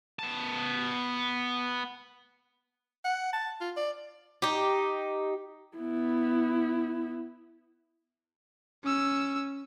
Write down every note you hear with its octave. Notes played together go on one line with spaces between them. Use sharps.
B3 A5
F#5
A5
F4
D5
D#4 G4
B3 E4
C#4 E6